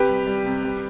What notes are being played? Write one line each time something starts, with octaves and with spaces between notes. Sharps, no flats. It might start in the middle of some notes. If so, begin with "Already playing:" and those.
Already playing: C3 G4 B4
G3
G3
C3
G3